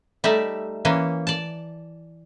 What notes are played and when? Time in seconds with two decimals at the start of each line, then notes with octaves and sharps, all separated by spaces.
0.24 G3 A3 D#4 D5 E5
0.85 E3 A#3 C#4
1.27 D5 A5